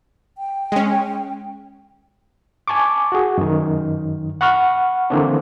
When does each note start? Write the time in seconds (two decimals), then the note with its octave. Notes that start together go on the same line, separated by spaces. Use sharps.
0.38 G5
0.72 G#3 C#4
2.68 G#5 A5 C#6 D6
3.12 F#4 G#4
3.38 F#2 D#3
4.41 F#5 B5 C#6 F6
5.10 D3 E3 A#3 C4 D4